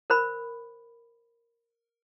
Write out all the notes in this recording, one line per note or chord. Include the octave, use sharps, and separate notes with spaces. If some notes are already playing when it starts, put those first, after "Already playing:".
A#4 C5 B5